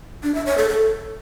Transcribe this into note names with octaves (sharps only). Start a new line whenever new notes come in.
D4
E5
C#5
A4
A4